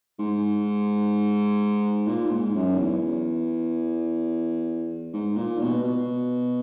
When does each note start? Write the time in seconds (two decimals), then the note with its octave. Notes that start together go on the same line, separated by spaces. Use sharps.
0.19 G#2
2.07 A#2
2.31 G#2
2.55 F#2
2.78 E2
5.13 G#2
5.36 A#2
5.61 B2
5.83 B2